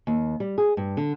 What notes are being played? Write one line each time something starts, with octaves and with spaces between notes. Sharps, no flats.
D#2
G3
G#4
G2
D3